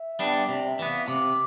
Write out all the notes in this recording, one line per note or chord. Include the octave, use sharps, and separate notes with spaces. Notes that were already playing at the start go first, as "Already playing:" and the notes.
Already playing: E5
G3 B3 D4
C3 D5
E5
E3 B3
F5
C3 D6